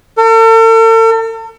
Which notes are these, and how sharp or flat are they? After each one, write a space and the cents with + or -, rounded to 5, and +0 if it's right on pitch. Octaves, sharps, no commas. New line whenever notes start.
A4 +45